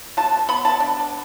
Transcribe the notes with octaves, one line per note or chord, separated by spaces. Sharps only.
B2 A5
B3 B5
A5
D4